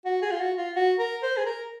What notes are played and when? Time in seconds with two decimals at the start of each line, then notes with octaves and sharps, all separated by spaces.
0.05 F#4
0.22 G#4
0.31 F4
0.40 F#4
0.58 F4
0.76 F#4
0.99 A#4
1.23 C5
1.37 G#4
1.46 A#4